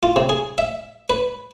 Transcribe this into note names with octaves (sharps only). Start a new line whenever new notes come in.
F4
C3
G#4
E5
B4